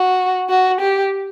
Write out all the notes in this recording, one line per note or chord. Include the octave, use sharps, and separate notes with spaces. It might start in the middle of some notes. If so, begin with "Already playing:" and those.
Already playing: F#4
F#4
G4